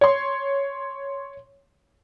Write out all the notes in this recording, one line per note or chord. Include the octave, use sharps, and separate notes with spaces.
C#5 C6